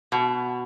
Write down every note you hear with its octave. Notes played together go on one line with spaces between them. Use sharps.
B2